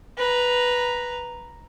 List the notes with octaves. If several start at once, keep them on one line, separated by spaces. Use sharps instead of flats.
B4 A#5